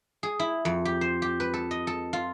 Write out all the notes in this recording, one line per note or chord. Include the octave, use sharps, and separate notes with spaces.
G#4
E4
F2
G4
C5
G4
B4
A4
D#5
A4
F4